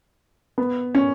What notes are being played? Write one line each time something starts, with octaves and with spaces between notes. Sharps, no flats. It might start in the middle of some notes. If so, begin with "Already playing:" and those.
B3
C#4